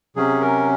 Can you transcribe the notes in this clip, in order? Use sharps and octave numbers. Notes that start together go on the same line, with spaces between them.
C3 F#3 C#4 G#4
A#4